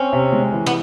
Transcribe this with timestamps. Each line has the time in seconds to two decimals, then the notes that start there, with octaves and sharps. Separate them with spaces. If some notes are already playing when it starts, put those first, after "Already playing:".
Already playing: C4 C#4
0.13 C3
0.32 G#3
0.52 E3
0.66 B3